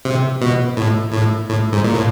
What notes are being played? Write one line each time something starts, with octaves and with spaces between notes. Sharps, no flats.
C3
B2
A2
A2
A2
G#2
A#2
A2